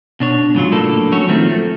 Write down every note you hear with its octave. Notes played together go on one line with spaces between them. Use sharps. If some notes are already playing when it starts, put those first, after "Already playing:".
B2 D4 C#5
G#2 C#3 F#3 F4
A2 A3 A#3 D4 A4
F#3 A3 C#4 F#4 C#5
D#3 F3 A3 C4
A3